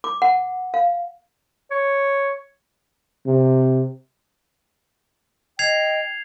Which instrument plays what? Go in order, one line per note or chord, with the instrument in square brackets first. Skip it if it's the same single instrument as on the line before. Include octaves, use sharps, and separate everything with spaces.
[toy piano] D6
F#5
F5
[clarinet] C#5
[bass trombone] C3
[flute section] D#5 G5 [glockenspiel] G#6 C7 F7